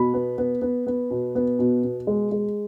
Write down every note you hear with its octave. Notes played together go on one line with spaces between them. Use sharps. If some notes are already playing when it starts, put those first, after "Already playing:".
Already playing: B2 B5
B3
B3
B3
B3
B2
B3
B2
B2
G#3
G#3